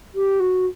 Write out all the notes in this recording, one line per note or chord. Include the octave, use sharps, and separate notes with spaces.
G4
F#4